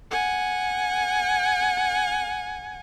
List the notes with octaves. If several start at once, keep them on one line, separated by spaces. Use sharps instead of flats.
F#5 G#5